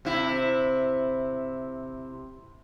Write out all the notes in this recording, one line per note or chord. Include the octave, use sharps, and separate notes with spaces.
C3 E4